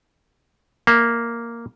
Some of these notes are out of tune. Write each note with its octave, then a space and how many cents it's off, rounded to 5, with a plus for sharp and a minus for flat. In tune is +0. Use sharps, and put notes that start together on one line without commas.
A#3 +0 E5 +0